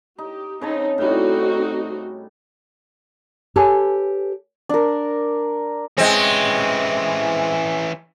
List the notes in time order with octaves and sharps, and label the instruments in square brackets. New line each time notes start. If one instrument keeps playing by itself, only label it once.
[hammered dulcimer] D#4 [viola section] G4
[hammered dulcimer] C#3 C#5 A5 [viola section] C4 D#4
[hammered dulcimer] A2 G3 [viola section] C4 D#4 F#4
[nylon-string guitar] G4 A4 B4 C#5 G#5 A5
[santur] D4 A#4
[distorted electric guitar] E3 C#4 [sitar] G#3 C4